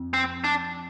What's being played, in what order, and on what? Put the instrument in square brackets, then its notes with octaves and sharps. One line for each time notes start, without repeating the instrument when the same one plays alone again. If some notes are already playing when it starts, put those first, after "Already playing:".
Already playing: [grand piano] F2
[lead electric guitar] C4
D4